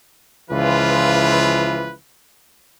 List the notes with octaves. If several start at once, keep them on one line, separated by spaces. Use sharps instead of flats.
C#2 E3 F3 E4 F4 B4